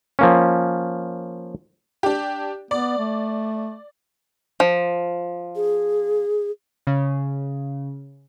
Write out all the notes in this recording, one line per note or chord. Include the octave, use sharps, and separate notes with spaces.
F3 A#3 C#4
D4 G4
B3 D5
A3
F3
G#4
C#3